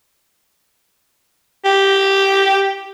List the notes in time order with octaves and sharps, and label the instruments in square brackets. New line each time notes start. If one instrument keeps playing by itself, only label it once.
[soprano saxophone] G4